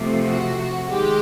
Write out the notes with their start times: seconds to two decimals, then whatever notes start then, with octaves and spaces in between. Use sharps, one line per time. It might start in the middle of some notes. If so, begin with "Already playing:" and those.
Already playing: C3 F3 A3
0.25 F#4
0.90 D#3 G#3 G4